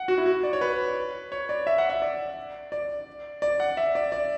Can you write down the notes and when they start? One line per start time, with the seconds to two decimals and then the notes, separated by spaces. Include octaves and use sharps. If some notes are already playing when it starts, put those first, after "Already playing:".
Already playing: F#5
0.08 F#4
0.18 E4
0.26 F#4
0.43 D5
0.53 C#5
0.61 B4
1.32 C#5
1.49 D5
1.67 E5
1.78 F#5
1.90 E5
2.02 D5
2.72 D5
3.42 D5
3.60 F#5
3.77 E5
3.95 D5
4.12 D5